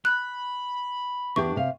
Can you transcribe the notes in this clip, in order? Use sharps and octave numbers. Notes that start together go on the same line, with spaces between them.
B5 F#6
E2 D4 G4 C#6
C3 F5